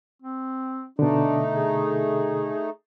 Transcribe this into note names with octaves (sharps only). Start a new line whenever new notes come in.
C4
B2 D3 A3 D4 D#4
G#4